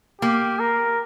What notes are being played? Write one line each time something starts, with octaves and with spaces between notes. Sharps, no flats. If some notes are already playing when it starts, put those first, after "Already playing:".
A#3 G4
A#4